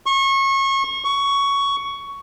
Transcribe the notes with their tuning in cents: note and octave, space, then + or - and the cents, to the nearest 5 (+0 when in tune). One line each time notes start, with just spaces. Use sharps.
C#6 -30
C#6 +10